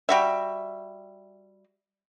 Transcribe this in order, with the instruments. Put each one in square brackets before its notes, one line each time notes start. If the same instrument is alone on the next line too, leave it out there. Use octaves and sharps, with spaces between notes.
[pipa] G3 F#4 E5